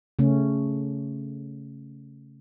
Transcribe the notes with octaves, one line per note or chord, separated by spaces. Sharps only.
C#3 A3 C#4